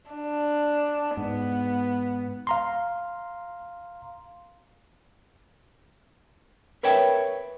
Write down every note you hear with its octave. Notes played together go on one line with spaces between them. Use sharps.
D4
G#2 B3
F5 A#5 C6
A#4 B4 C#5 E5 G5